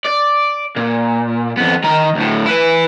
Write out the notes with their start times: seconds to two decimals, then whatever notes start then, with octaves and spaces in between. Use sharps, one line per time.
0.06 D5
0.76 A#2
1.57 F2 B3
1.84 D#3 A#5
2.15 D2 A2
2.46 E4 B4